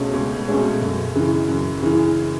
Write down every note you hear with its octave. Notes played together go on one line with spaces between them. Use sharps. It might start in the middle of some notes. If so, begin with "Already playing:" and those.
Already playing: C#2 B2 A3 C#4 G#4
C#2
B2 A3 C#4 G#4
F#2
C#3 E3
F#2
C#3 E3